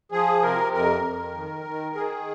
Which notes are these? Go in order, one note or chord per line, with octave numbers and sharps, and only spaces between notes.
F3 G#4
C3 A#4
F2 A#4
F2
D#3
D#3
D#3 G#4